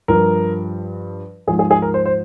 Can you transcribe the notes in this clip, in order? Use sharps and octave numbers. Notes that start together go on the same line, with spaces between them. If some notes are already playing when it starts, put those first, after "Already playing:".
G2 F3 A#4
G#2 F3 G#4
G#4
G#4
A#4
C5
C5